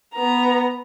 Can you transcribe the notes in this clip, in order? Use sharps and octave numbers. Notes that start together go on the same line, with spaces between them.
B3 A#5